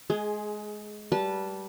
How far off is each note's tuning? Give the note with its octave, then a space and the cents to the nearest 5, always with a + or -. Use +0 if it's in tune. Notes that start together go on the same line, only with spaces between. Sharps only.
G#3 +20 G#4 +0
G3 -20 B4 -25 A5 -5